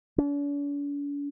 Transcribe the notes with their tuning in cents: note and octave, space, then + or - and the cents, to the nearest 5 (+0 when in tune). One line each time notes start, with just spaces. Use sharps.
D4 -45